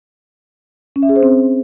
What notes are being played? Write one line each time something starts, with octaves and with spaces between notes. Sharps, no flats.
C#4
E5
G#4
C5
C4